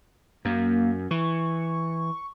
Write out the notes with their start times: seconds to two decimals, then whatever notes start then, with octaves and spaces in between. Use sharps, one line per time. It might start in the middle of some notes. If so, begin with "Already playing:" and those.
0.45 F#2 A#3
1.11 E3 C#6